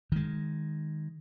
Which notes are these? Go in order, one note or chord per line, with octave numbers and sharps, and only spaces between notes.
D#3 G#3